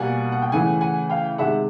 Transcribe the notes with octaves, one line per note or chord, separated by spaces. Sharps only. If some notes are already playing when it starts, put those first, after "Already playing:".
Already playing: B2 G3 A#3 F#5 G#5
F#5
G5
C#3 E3 A3 F#5 G#5
F#5 G#5
F5 G5
C3 D#3 G#3 E5 F#5